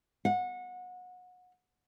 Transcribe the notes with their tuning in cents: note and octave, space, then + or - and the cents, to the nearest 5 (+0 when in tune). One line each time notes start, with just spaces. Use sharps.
F#5 -25